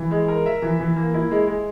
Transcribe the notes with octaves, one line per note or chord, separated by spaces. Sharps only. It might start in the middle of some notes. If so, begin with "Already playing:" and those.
Already playing: E3
G#3
A#4
E5
E3
E3
A#3
E4
G#3
G#3